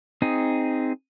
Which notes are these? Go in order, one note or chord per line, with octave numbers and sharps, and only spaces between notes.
C4 D#4 G#4